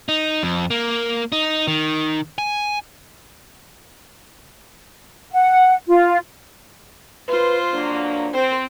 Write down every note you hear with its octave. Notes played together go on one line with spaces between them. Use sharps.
D#4
F2
A#3
D#4
D#3
G#5
F#5
F4
F4 B4 C5
F2 F#3 A#3 D4
C4 C5